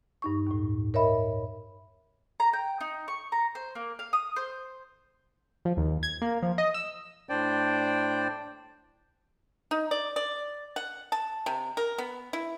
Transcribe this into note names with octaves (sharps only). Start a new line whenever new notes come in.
G2 D#4 C#6
D#2 A2
A#4 C#5 D#5 E5 B5
A#5
G5
D#4
C#6
A#5
C5
A#3
F5
D#6
C5
F3
D#2
G#6
A#3
F3
D#5
E6
A2 D4 C5 D5 G5
D#4
D5
D5
F#5
A5
C3
A#4
B3
E4